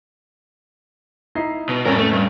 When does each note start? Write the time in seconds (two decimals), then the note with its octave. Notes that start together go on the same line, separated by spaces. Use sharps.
1.35 D#4 E4 C7
1.69 B2
1.85 F2 A2 G3 C#4 A#4
1.98 A3
2.13 G2